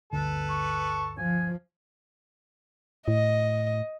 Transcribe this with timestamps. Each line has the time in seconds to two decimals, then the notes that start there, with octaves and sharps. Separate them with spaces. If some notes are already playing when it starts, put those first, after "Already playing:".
0.13 G1 D2 D3 A4 B4
0.50 C#6
1.18 F3 G#5
3.08 A2 D#5